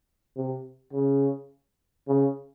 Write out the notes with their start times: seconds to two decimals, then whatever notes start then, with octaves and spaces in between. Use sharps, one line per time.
0.37 C3
0.93 C#3
2.08 C#3